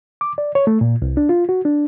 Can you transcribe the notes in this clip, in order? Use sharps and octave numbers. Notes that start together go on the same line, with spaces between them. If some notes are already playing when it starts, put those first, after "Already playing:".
D6
D5
C#5
A3
A#2
C2
D4
F4
F#4
D4